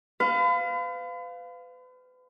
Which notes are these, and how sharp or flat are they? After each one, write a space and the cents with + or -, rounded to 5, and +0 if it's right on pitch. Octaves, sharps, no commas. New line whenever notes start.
B4 +40 F5 +0